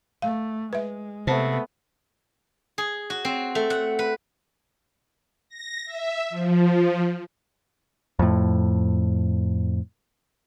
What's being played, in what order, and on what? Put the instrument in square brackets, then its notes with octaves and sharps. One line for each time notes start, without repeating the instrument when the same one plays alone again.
[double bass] A3 [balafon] F5
[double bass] G#3 [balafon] B4 E5
[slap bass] C3 [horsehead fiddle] A3 B3 [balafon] C5 A5
[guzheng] G#4
F#4
C4
A3
F#5
B4
[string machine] A#6
E5
F3
[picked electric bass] F2 A2